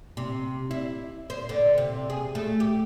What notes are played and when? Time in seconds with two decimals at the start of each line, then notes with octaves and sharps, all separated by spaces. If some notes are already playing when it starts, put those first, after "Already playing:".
0.17 C3
0.71 E4
1.30 C5
1.49 D3
1.78 C3
2.10 G#4
2.35 A3
2.60 G4